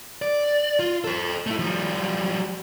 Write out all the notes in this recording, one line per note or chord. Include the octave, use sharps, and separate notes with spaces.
D5
F4
A4 C5
A3 E4
F3 G3